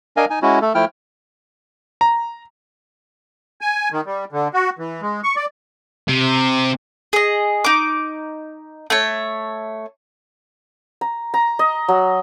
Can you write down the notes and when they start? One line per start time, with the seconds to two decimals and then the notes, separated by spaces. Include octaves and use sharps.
0.17 D4 A#4 D#5 F5 G#5
0.30 D#4 G#5
0.42 G#3 C#4 E4 F#4
0.61 A3 A4
0.75 F3 A3 E4 G5 F6
2.01 A#5
3.61 G#5
3.92 D#3
4.06 G3
4.32 D3
4.54 F#4
4.79 E3
5.02 G#3
5.23 C#6
5.36 D5
6.08 C3
7.13 G#4 D#5
7.64 D#4 D6
8.90 A3 C#5
11.01 A#5
11.34 A#5
11.59 D#5
11.89 F#3